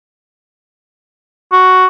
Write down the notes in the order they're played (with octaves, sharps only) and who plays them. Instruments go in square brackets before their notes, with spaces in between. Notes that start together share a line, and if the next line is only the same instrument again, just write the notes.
[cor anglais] F#4